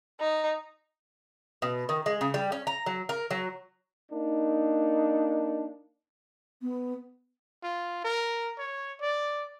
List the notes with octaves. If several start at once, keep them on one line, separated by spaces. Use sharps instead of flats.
D#4
B2
D#3
G#3
C#3
G3
C#4
A#5
F#3
A#4
F#3
A#3 D4 D#4
B3
F4
A#4
C#5
D5